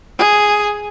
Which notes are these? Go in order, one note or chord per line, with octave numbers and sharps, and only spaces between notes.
G#4